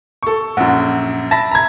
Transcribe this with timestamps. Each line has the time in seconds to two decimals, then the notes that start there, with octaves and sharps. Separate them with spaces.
0.23 A4 C#6
0.57 A#1 F#2 F#5
1.31 E5 A5 B5 A#6
1.51 A#5 G#6